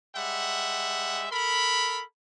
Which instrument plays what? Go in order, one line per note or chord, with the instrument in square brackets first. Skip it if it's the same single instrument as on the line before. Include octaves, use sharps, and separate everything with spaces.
[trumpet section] G3 G#3 E5 F#5
A4 A#4 B5